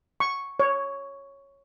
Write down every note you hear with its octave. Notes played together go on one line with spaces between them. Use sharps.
C#6
C#5